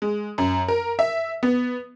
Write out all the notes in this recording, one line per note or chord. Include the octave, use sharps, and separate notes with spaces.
G#3
F#2
A#4
E5
B3